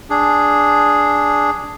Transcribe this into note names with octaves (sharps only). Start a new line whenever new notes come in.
D4 G#4